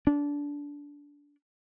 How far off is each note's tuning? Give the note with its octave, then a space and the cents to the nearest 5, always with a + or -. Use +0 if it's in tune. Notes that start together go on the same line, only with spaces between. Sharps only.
D4 -20